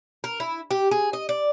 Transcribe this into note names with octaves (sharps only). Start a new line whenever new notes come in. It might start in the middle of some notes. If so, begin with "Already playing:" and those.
A#4
E4
G4
G#4
D#5
D5